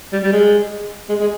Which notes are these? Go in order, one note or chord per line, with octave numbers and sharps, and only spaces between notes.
G3
G3
G#3
G#3
G#3